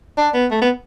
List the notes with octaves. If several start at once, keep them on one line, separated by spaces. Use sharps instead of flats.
D4
B3
A3
B3